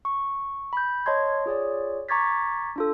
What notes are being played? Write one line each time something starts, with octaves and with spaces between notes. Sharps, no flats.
C#6
B5 G6
C#5 D#5 A5 C6 G#6
F4 G#4 C#5 D5
A#5 C#6 D6 G#6 A6 B6
D4 F4 A4